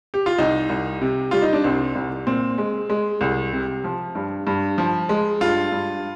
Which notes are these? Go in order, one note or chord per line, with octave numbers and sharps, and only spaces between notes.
G4
F4
C2 D#4
C2
C3
G3 F4
D#4
D4
C2 C4
C2
A#2 C4
G#3
G#3
C2
C3
F3
G2
G2
F3
G#3
G2 F4
G2